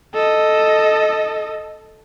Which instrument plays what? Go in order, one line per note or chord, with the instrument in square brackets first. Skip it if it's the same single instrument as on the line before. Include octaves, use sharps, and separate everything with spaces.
[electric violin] A4 D#5